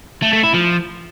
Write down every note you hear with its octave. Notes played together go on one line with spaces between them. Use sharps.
A3
A3
E4
F3